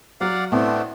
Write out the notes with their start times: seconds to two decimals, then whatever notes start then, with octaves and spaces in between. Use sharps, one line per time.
0.21 F#3 D5 F5 F#5
0.52 A2 A3 B3 C4 D4